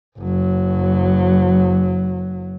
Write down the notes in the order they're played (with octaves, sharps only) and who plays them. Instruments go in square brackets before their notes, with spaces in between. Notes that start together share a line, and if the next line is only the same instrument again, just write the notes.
[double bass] F#1 F#3